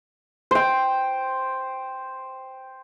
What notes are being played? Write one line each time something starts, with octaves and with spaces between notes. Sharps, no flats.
C5 G5